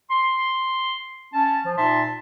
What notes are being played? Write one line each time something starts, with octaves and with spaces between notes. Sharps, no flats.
C6
C#4 A5
F3
A#2 D#4 E5 A5 C6